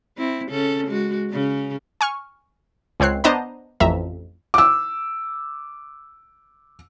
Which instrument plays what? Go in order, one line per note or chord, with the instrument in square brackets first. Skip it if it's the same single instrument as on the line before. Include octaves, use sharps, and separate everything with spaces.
[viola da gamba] C4 E4
C#3 C#4 A4
G#3 F#4
C#3 C#4
[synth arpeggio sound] G#5 C#6 F6
C#2 C4 C#5 F#6 C7
B3 D4 C5 D#5 A5 A#5
A1 F2 E5 A#5
[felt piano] D6 E6